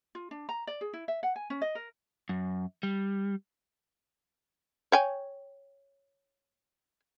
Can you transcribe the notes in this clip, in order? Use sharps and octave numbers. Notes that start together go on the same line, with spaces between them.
F4
D4
A#5
D5
G#4
E4
E5
F#5
G#5
C#4
D#5
A#4
F#2
G3
C#5 G5 G#5